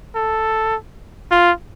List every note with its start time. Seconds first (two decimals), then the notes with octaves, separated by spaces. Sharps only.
0.15 A4
1.31 F4